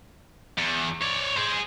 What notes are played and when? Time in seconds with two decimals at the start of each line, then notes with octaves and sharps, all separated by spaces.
0.58 E2
1.02 C#5 D5
1.37 G#4 C5